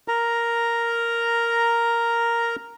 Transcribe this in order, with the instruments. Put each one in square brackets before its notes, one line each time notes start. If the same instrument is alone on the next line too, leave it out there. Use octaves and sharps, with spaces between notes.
[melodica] A#4 A#5